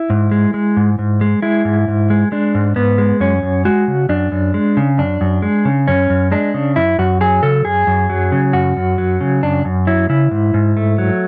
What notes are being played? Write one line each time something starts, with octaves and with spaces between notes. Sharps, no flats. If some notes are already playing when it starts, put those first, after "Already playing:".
Already playing: E4
G#2
G#3
G#3
G#2
G#2
G#3
G#3 E4
G#2
G#2
G#3
G#3 D4
G#2
G#2 B3
G#3
F#2 C#4
F#2
G#3 F#4
C#3
F#2 D4
F#2
G#3
C#3
F#2 D4
F#2
G#3
C#3
F#2 C#4
F#2
G#3 D4
C#3
F#2 E4
F#2 F#4
F#3 G#4
C#3 A4
F#2 G#4
F#2
F#3
C#3
F#2 F#4
F#2
F#3
C#3
F#2 D4
F#2
F#3 E4
C#3 E4
G#2
G#2
A3
F#3